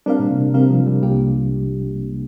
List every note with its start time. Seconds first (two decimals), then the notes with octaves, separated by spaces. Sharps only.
0.06 G3 C4 D4 A#4 F5
0.19 A#2
0.30 C3
0.54 C3 G3 C4 A#4 F5
0.70 F3
0.86 G3
1.03 C2 C3 A#3 G4